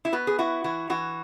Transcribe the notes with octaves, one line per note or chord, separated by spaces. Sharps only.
E4
B3 F#4
G#4
E4 F#4
E3 F#4
E3 F#4